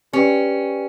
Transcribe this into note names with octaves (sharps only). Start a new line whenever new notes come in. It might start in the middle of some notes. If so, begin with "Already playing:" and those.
C#4 G4 B4 D5 G5